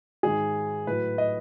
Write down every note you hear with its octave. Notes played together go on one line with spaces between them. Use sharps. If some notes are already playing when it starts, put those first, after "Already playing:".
G#2 D#3 G#3 G#4
A2 F#3 B4
D#5